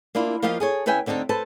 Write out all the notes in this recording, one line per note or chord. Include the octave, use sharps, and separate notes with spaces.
A#3 D4 E4 F4
F3 A#3 F4 G4 D#5 F5
G#4 A4 C#5
E2 C#4 B4 E5 G5 G#5
D2 D3 C4 D#4 A4
A4 B4 C5 A5